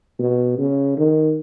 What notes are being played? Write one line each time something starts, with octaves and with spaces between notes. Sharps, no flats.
B2
C#3
D#3